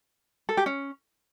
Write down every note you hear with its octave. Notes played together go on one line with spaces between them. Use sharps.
A4
G4
C#4